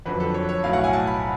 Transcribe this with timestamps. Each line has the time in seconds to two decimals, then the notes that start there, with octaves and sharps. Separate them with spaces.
0.06 F2 D3 F#3 B4
0.20 A4
0.34 C#5
0.49 C#5
0.64 B1 A2 F#3 F5
0.73 F#5
0.84 G#5
0.93 A5
1.07 B5